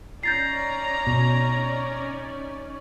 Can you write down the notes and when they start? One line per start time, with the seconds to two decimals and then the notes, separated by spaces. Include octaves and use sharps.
0.23 C#4 D#4 D5 A#5 G6 A6 C7
1.07 B2